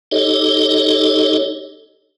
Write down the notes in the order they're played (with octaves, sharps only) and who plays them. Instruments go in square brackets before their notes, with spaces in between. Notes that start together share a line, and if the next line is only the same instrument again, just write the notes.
[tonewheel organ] D#4 G4 A4 C#5 D#5